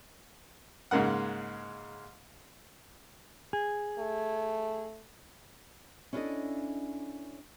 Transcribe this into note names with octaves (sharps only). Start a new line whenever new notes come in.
G#2 C#3 G#3 A#3 F#5
G#4
A3
C#4 D4 E4 G4 A4 D#5